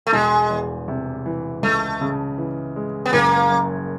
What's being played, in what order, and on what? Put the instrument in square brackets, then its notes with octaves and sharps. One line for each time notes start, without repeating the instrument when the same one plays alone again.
[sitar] A3
[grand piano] E1 [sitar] G#3
[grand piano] E2
C3
E3
[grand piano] C#2 [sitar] A3
[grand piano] C#3
E3
G#3
[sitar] B3
[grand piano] F#1 [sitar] A#3
[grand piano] F#2